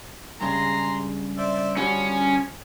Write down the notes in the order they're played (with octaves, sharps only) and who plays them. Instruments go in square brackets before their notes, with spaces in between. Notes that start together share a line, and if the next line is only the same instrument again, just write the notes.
[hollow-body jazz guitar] G2 C#3 G#3 [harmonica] G#4 A#5 C6
[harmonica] C5 D5 E5
[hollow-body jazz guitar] D3 G3 F#4 [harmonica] F3 [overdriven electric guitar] C#4